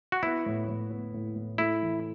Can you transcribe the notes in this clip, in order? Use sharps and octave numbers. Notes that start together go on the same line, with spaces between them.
F#4
B3 E4
A2
A2
B3
A2
A2
A3 E4
E3